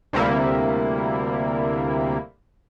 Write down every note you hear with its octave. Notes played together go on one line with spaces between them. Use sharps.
D2 C3 G3 A#3 E4